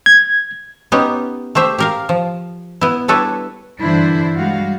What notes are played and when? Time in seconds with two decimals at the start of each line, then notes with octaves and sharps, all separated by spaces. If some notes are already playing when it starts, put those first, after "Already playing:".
0.06 G#6
0.92 B3 C#4 D#4 G4
1.55 A3 G4 C5 E5
1.79 G4 A#4 F5
2.09 F3
2.81 B3 E4
3.08 G3 D4 E4 A4 B4 C#5
3.80 G2 D3 E3 D4 E4 C5
4.34 G3 G#3 F#4 F5